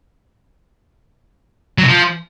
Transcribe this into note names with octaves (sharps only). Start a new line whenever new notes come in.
F#3
C3
F3